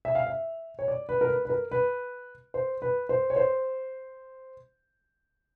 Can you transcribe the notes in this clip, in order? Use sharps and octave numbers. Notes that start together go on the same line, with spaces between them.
E5
F5
E5
C#5
D5
B4
A#4
B4
B4
A#4
B4
C5
B4
C5
C#5
C5